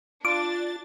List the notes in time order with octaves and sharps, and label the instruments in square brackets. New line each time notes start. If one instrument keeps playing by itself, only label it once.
[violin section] D4 A6 [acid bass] F4 [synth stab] D6